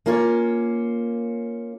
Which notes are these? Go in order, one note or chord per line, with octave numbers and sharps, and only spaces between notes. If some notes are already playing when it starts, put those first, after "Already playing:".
A#3 C#4 F4 C#5